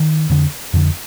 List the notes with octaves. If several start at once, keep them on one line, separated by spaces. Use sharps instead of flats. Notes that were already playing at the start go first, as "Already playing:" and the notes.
Already playing: D#3
F2 D3
F2 D3